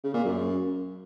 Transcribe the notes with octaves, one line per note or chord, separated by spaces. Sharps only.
C#3
A#2
F#2